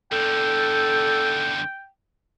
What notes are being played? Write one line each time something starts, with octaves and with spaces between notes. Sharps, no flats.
E2 D3 A4 G5